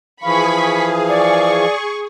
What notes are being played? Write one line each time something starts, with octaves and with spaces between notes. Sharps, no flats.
E3 F3 G#4 F5 B5 C#6 B6
D5 C#6